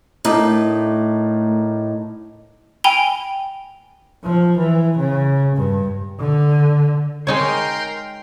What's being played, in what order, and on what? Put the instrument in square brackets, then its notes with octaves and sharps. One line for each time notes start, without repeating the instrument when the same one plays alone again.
[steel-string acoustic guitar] A2 [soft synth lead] A3 [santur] D4 D#4 A#4
[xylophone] G5 G#5 B5 D7 F7 G7
[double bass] F3
E3
C#3
G2
D3
[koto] G#3 D#4 C#5 [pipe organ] A#4 G5 C6